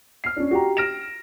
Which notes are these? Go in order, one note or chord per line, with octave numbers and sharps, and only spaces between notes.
F6 C7
C#4 D4
F#4 G4 A#5
F6 A#6 D7 E7